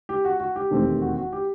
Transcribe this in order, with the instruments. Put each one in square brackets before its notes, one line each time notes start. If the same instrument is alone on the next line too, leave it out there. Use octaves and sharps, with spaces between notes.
[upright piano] G4
F#4
F#4
G4
E1 D#2 D#3 A3 C4
F#4
F#4
G4